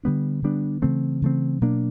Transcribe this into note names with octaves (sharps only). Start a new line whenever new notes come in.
D3 G3 B3 D4
D3 G3 B3 D4
C#3 E3 A3 C4
C#3 E3 A3 C4
B2 F#3 A#3 D4